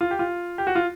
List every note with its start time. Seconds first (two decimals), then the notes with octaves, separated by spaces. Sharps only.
0.01 F4
0.11 G4
0.19 F4
0.58 G4
0.67 F#4
0.75 F4